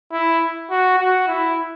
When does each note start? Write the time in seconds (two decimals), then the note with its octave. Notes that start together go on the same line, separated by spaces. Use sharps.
0.12 E4
0.71 F#4
0.99 F#4
1.28 E4